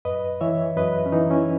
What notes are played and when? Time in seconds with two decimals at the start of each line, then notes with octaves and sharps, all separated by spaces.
0.05 F#2 B4 D#5
0.41 E3 C#5 E5
0.76 F#2 B4 D#5
1.06 C#4
1.12 E3 D#4
1.30 C#4 E4